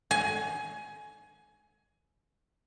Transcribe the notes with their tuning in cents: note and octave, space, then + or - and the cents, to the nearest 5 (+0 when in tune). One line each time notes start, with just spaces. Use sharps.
G#5 +20